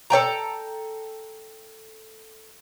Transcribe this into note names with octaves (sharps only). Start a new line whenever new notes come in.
A4 C#5 G5 A#5